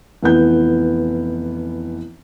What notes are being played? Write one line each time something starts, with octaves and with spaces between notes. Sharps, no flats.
F1 E3 B3 G6